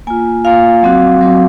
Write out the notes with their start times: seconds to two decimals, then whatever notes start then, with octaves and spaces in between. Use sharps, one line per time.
0.07 A#3 F4 G#5
0.45 A#3 F4 F5
0.82 F#3 C4 F#4
1.21 F#3 C4 F#4